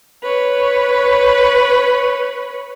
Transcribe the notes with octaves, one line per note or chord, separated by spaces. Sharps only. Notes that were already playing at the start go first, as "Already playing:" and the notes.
B4 C#5